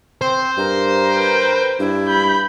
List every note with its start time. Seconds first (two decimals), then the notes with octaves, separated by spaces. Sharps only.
0.21 C4 C5
0.58 G2 A#4
1.13 B4 G5
1.80 G2 D4 E4
2.08 B5 G6